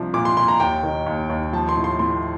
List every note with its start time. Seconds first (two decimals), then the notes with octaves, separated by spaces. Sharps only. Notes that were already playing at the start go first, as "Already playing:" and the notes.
Already playing: C2 F3 D4
0.14 A#2 D6
0.25 C6
0.37 A#2 C6
0.48 A#5
0.60 D#2 G5
0.83 D#3
1.06 D#2
1.30 D#2
1.53 F3 A5
1.69 C6
1.76 A2
1.84 C6
1.99 A2 C6